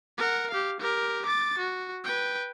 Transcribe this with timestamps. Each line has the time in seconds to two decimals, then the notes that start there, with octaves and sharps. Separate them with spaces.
0.18 A#4 F#5
0.50 G4 F5
0.80 G4 A#4
1.26 D6 A6
1.58 F#4
2.04 B4 G5